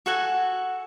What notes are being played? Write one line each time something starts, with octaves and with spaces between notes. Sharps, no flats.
F#4 A4 F#5 G#5